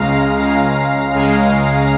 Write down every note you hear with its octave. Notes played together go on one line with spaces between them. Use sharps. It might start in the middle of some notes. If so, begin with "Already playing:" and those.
Already playing: C#2 C#3 G#3 F5 A#5
C#2 C#3 G#3
C#2 C#3 G#3